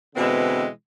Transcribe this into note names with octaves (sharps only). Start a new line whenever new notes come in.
B2 D3 E3 G#3 C4